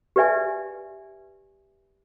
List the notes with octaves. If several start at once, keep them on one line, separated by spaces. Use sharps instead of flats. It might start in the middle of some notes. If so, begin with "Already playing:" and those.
G4 B4 D5 E5 G#5